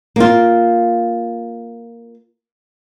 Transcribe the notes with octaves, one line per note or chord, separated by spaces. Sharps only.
A#3 F4